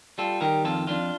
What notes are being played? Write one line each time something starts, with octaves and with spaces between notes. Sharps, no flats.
G3 F4 A4
D#3 G4 A#4
F2 F4 A4
F2 D4 F4